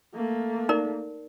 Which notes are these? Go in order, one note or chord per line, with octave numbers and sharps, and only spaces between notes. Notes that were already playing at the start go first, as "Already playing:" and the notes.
A3 A#3
D#4 A#4 D5